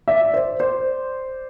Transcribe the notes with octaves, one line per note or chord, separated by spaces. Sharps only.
D5 E5
C5 D5
C5 D5